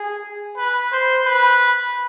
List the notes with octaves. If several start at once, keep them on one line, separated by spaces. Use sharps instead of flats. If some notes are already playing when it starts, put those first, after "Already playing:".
Already playing: G#4
B4
C5
B4